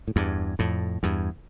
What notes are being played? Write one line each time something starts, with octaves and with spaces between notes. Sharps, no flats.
A2
E2 G2
F2 A2
E2 G2